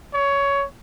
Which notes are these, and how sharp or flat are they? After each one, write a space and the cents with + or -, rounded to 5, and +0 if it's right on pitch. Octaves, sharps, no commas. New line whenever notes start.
C#5 +15